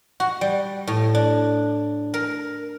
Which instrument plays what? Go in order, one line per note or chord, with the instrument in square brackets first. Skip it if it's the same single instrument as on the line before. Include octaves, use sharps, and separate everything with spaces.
[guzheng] F#4
G3
A2
D4
A#4